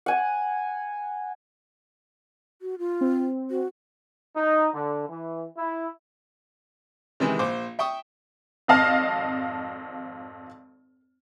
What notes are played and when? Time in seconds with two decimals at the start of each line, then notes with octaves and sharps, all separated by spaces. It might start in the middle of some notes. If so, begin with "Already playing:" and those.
0.06 F#5 G#5
2.62 F#4
2.78 F4
3.01 C4
3.51 F#4
4.36 D#4
4.74 D3
5.08 E3
5.57 E4
7.20 C3 D#3 E3 G#3
7.39 A#1 C5 D6
7.79 E5 G5 C#6 D#6
8.68 G#1 F2 D#5 F5 A5 F6